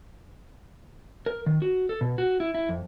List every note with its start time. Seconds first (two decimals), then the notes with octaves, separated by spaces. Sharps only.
1.26 A#4
1.46 D#3
1.62 F#4
1.89 A4
2.01 B2
2.18 F#4
2.40 E4
2.55 E4
2.69 F2